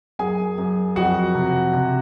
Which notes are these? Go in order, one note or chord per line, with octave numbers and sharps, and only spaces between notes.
F#2 G#4 G#5
F#2
F2 F#4 F#5
C3
C3